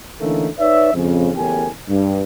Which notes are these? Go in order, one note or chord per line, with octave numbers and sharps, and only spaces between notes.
D3 E3 A3 A#3 C#4 D#4
D#4 B4 C#5 D5 E5
F2 G#2 C#3
F#1 E2 A2 G4 A#4 G#5
G2